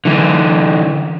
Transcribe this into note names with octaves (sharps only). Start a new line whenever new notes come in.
D3 E3